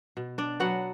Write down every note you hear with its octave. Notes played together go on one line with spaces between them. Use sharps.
B2
D4 D5
F#3 B3 F#4 F#5